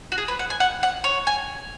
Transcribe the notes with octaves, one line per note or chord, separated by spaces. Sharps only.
F#4
G#4
B4
F#5
G#5
F#5
F#5
C#5
G#5